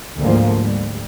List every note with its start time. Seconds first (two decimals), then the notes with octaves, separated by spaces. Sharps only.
0.20 D2 G#2 F3 A#3
0.62 G3